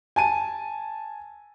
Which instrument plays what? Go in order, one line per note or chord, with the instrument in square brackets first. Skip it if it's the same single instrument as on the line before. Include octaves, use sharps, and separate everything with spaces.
[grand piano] G#5 A5 D#7